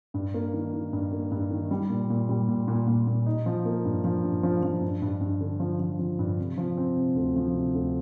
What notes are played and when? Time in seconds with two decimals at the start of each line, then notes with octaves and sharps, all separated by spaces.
0.14 G2
0.34 A#3
0.53 D#3
0.73 D#3
0.93 G2
1.12 A#3
1.31 G2
1.51 D#3
1.71 G3
1.90 A#2
2.10 A#2
2.29 G3
2.48 A#2
2.68 A#2
2.87 A#2
3.07 A#2
3.26 D#4
3.46 F3
3.65 A#3
3.85 G2
4.04 F3
4.24 G2
4.43 F3
4.63 F3
4.82 G2
5.02 G2
5.21 G2
5.41 D3
5.60 F3
5.80 F3
5.99 F3
6.19 G2
6.38 C3
6.57 F3
6.77 C4
6.97 C3
7.16 D2
7.36 F3
7.55 C3
7.75 D2